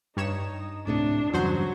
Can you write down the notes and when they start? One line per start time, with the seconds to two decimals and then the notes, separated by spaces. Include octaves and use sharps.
0.17 G2 D#4 C#5 E7
0.87 D1 A2 C3 D4
1.33 E2 G2 C#3 F#3 F#4 C5